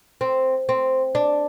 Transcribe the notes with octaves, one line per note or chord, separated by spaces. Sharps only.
C4
C4
D4